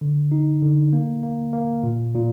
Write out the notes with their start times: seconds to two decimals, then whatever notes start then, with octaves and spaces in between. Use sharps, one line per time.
0.01 D3
0.32 D#4
0.62 D3
0.93 A#3
1.23 A#3
1.53 A#3
1.83 A#2
2.15 A#2